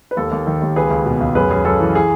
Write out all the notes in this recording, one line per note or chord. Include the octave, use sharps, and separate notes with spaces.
B4
D#2 A4
D#2
D#3
D#2
C#2 G#4 B4
C#2
B2
C#2
F#2 G#4 B4
F#2 G#4
F#2 A4
E3
G#4